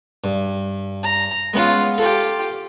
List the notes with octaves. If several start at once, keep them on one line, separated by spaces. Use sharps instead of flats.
G2
A#5
G#3 B3 C#4 F4 F#5
F4 G4 A4